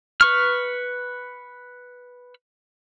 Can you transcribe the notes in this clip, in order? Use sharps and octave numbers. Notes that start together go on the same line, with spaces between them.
B4 C#6 F6